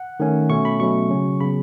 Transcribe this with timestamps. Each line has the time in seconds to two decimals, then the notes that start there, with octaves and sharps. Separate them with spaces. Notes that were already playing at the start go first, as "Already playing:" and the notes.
Already playing: F#5
0.20 D#3 A3 C#4
0.50 B2 A3 C#4 C#6
0.65 B5
0.80 B2 F#3 A3 C#4 C#6
1.10 C#3 F#3 C#4
1.40 C#3 F#3 B3 B5